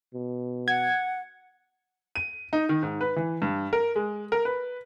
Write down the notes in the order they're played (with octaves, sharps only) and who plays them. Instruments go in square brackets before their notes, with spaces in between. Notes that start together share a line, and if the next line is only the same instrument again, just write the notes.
[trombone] B2
[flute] F#5 [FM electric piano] G#6
[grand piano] D#7
D#4
D#3
G#2
B4
E3
G2
A#4
G#3
A#4
B4